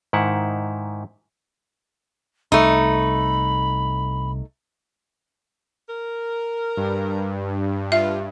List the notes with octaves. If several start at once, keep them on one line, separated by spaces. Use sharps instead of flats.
G#2 D#3 E4 F#5
C2 A3 D#4 B5
A#4
G2
F4 E5